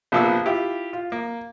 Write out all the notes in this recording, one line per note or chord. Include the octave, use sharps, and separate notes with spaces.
A#1 C3 F3 A#3 B3 E6
E4 F4 G4
F4
A#3